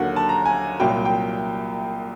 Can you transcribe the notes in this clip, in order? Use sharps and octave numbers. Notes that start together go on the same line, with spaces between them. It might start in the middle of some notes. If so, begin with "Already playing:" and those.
Already playing: D#2 D3 F#3 F#5
A5
A#5
G#5
C2 A#2 F#3 G5
G5